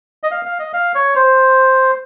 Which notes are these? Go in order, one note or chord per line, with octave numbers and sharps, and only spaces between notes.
D#5
F5
F5
D#5
F5
C#5
C5